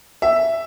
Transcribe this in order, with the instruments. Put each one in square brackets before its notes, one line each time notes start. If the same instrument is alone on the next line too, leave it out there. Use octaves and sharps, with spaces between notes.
[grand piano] E5